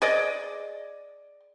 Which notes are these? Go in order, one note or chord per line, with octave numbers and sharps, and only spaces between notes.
G#4 D5 D#5